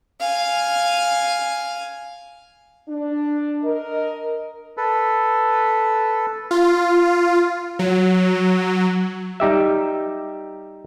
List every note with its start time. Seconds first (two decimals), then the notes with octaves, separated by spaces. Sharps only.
0.20 F5 G#5
2.89 D4
3.64 A#4 D#5
4.77 A4 B4
6.51 F4
7.79 F#3
9.40 G3 D#4 G4 E5